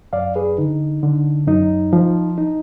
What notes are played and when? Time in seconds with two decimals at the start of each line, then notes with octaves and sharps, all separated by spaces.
0.13 F#2 D5 F5
0.36 G#4 B4
0.58 D3 D#4
1.03 D3
1.47 F#2 D#4
1.93 F3
2.38 D#4